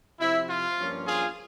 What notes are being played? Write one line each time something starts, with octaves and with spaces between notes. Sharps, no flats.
C3 F3 C4 E4
F4
G2 F3 A#3 C#4
F4 G#4